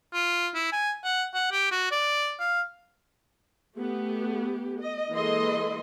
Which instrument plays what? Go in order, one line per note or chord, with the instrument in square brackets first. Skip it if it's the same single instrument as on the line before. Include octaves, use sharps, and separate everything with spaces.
[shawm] F4
E4
G#5
F#5
F#5
G4
F#4
D5
F5
[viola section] A3 B3 G4
D#5
E3 G#3 A#3 A4 D#5 C6